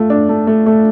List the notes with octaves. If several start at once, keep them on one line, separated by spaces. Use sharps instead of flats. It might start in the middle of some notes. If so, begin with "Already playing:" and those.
Already playing: A3 F4
D4
A3
A3
A3